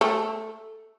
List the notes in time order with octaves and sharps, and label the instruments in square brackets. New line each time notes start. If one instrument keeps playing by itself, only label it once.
[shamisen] A3